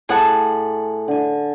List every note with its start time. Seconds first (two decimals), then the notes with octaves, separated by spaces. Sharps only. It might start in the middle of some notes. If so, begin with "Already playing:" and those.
0.09 A2 G#4 F#5 A5
1.08 D3 G#5